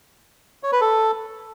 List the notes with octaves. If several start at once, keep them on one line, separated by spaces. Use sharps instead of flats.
C#5
B4
A4